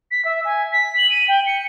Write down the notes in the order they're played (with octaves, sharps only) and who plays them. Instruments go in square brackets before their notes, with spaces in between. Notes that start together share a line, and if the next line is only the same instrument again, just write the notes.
[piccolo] B6
E5
G#5
B6
F#7
D#7
G5
C#7